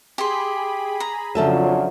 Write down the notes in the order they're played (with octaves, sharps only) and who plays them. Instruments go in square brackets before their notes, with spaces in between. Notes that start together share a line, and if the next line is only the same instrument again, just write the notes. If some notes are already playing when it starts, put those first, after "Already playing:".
[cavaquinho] G4 C6 [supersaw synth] G#4 B5
[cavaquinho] A#5
[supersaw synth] F2 C#3 [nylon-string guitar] F3 A4 E5 [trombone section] F#3 D4 F4